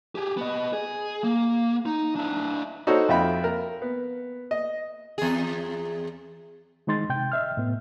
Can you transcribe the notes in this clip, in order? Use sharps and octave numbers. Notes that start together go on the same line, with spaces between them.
G4 G#4
B3 D#5
G#4
A#3
D#4
D4 E4
D#4 F#4 A4 C5 C#5
F2 F4 E5 G5 B5
A#4
B3
D#5
E2 G#4
D#3 G#3 D#4 C6 A6
C3 G5 G6
D#5 E5 F6
A2 B3